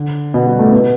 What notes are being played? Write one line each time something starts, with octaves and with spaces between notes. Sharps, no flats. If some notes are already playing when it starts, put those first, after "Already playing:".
Already playing: D3
B2 B3
G3
A2 A3
B2 B3